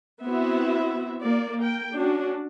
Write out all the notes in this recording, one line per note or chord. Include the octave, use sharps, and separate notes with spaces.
B3 C4 E4 F#4 E5
A#3 D5
A#4 G5
C#4 D4 F#4